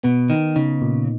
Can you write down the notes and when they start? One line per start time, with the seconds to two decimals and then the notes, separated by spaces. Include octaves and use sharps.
0.04 B2 B3
0.30 D#3 D#4
0.56 C#3 D#4
0.82 A#2